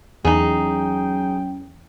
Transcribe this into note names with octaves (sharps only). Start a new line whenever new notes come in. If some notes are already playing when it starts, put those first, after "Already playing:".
E2 F#3 C#4 D#4 G#4 G5